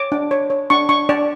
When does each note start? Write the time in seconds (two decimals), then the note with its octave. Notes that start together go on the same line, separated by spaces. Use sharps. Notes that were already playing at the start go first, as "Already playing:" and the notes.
Already playing: C#5 D6
0.12 D4
0.31 C#5
0.50 C#5
0.70 D4 C#6
0.89 D4 C#6
1.09 D4 D5